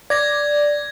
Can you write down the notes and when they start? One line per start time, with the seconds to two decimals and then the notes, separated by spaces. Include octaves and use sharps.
0.10 D5 G#6 A#6